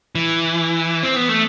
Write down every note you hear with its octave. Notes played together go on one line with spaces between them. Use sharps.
E3
C4
B3
A3